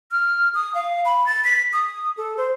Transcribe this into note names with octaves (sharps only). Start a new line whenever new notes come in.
F6
D#6
F5
B5
A6
B6
D#6
A4
C5